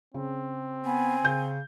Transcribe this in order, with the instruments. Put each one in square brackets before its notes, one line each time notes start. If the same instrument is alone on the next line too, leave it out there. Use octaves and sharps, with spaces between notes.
[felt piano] C#3 [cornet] C4
[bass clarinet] B3 [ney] G#5
[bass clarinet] C#3 [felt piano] G6